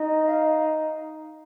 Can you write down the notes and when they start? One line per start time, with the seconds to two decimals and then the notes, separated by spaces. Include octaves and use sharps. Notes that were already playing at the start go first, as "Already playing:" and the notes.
Already playing: D#4 D#5
0.25 F5
0.47 F5